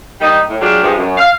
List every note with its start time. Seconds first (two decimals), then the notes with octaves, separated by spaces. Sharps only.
0.21 G3 A#3 D#4
0.50 A2
0.61 F#3 G#3 D4 F4 G4
0.83 G2 F3 G#3
0.97 F#2
1.18 F5